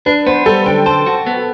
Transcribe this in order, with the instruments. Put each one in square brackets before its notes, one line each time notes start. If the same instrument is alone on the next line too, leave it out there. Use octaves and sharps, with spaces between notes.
[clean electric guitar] D4 [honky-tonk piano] B4
[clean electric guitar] B3 [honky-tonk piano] C5
[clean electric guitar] G3 [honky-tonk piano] A4
[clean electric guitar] D3 [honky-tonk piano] G5
[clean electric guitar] C5 [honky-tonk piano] A5
[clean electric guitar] F#4
B3